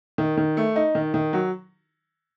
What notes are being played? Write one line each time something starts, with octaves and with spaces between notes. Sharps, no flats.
D#3
D#3
A3
D#4
D#3
D#3
F#3